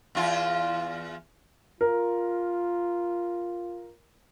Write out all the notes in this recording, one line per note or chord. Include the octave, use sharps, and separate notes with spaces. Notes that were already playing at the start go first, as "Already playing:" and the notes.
E2 F4
F4 A#4